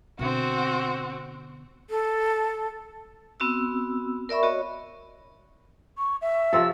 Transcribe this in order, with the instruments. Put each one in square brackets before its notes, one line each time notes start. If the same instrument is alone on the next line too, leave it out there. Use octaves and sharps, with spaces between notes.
[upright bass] B2 D3 [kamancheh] C4 F#4
[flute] A4
[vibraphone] B3 C4 F#4 E6
A#4 D5 E5 B5 C#6
F#4 C#5 D#5
[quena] C#6
E5
[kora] C3 F3 A4 [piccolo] E6